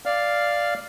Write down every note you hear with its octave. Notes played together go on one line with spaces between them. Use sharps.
D5 F5 F6